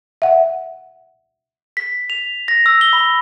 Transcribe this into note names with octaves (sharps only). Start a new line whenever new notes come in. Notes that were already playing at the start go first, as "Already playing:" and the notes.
E5 F#5
B6
F7
A#6
E6
G7
B5